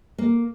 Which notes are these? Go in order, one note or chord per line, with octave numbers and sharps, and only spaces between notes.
A#3